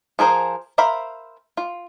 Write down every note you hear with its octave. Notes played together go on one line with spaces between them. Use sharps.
F3 G#4 A#4 C5 G#5
A#4 C5 E5 F5 B5
F4